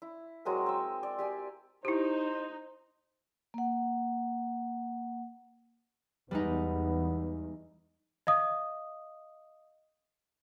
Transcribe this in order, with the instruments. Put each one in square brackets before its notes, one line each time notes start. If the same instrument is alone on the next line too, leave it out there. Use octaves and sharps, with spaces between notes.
[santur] E4
F#3 G#3 C4 A#4
C4 E6
D5
G4 D5 G#5
[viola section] D#4 [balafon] E4 G4 [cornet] C5
[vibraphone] A#3 F#5
[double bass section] E2 [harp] G3 G#3 D#4 [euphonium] B3
[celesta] D#5 F5 D#6